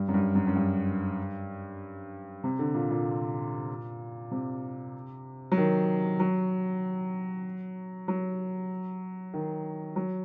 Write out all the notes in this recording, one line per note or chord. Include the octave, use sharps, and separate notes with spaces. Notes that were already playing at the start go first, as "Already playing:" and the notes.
Already playing: G2
F#2
G2
F#2
F#2
G2
C3
D3
A#2
A#2
C3
F#3
D#3
F#3
F#3
D#3
F#3